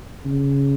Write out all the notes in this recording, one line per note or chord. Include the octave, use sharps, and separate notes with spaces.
C#3